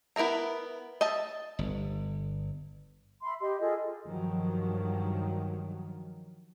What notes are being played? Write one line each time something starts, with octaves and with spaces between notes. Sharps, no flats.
B3 E4 A#4 E5 A#5
D#5 E5 A5
G1
E5 B5 C6
G4 D#5 C6
F4 G#4 A4 D#5
G2 D#3 F3 F#3